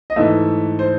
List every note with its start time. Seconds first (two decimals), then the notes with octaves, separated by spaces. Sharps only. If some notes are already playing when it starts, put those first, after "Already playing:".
0.10 D#5
0.16 G#2 E3 A3 E5
0.79 C5